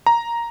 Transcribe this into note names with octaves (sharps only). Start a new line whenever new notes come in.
A#5